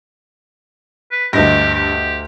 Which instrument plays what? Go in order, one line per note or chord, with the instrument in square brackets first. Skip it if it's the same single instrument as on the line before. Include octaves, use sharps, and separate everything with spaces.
[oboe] B4
[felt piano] D2 D#5 A#6 [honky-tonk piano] G2 [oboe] G4
[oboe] G4